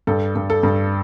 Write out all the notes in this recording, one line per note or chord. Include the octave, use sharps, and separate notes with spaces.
G2 A4
G2
A4
G2